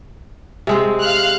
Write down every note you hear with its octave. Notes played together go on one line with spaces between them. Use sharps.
C3 G#3 C4
F5 F6 F#6